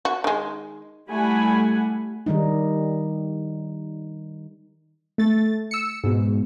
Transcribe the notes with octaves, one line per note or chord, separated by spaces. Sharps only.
F#4
D#3 G#3
G3 A3 E4 F#5 G#5 B5
D#3 G3 D#4
A3 A6
E6 C#7
G#2 B2